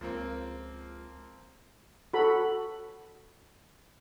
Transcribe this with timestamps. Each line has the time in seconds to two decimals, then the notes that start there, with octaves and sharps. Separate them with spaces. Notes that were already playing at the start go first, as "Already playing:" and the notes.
0.01 C#2 F3 A#3 C4
2.13 F#4 A4 B5